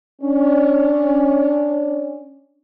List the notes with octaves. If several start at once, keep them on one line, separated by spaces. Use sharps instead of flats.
C#4 D4